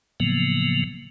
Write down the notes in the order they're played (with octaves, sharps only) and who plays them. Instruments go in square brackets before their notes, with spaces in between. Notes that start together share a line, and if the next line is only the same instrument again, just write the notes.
[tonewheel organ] A2 C#3 F3 F#3 A#3 B3